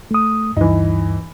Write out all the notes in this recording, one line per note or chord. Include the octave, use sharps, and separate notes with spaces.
A3 D#6
D2 G2 E3 D#4